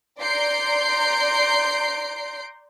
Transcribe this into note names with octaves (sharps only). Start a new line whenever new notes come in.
D5 A#5 C6 G6 C7 D7